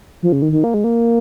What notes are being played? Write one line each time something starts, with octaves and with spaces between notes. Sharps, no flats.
F3
C#3
D#3
D#3
A#3
G#3
A#3